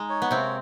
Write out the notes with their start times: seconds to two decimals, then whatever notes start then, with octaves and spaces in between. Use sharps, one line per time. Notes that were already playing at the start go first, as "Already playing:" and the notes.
Already playing: G#3 D#4
0.10 C#5
0.22 B3
0.31 C3 A#3 C4